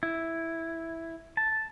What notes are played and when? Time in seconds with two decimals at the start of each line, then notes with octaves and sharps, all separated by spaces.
0.03 E4
1.37 A5